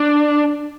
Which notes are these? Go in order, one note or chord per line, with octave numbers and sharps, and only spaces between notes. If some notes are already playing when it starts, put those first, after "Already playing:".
Already playing: D4